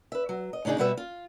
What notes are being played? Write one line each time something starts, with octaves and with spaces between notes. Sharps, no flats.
B4 E5
F#3
D#5
A2 C#3 D4 D#4 G#4
B2 G3 F#4 B4 E5
F4